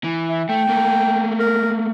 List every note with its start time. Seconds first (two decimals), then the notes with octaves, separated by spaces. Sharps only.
0.04 E3
0.30 E5
0.49 A3 G5
0.69 A3 A#3
1.40 A#4